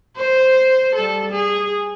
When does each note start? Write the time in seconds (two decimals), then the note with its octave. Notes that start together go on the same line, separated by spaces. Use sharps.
0.17 C5
0.95 G3 A4
1.31 G#4